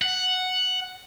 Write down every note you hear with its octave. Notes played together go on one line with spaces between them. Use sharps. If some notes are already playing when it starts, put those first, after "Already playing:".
F#5